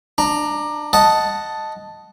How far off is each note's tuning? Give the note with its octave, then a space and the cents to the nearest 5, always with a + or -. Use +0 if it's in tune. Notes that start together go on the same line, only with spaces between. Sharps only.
D4 +20 A#5 +0
D#5 +0 F#5 +0 A5 +0